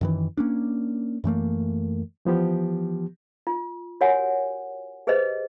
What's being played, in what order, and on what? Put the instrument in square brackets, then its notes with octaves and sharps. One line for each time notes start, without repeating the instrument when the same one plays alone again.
[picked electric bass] F#2 D#3 E3
A#3 C#4 D4
F#2 E3 A3 A#3
[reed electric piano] E3 F3 B3 G4
[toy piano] F4
F#4 G4 A#4 C#5 F#5 G#5
G4 G#4 B4 C5 D#5